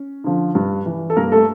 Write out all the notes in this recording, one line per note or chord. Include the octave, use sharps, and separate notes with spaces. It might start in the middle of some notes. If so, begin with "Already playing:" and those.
Already playing: C#4
D3 F3
G2
E3
A4
G2 A#3 A#4
A3 A4